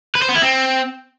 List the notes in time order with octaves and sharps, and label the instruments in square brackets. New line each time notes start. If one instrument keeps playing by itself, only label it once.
[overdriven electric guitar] B4
C5
B3
E4
C4